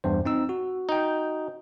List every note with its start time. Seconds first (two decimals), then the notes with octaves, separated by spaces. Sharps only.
0.04 E2 G2 C5
0.25 C4 D#4 E6
0.49 F#4
0.89 D#4 G5